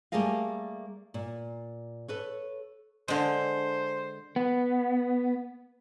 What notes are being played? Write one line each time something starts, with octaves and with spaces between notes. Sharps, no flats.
G3 A3 A#3 G#4 A#4 F5
A#2
A4 B4 C#5
D3 G#3 C5
B3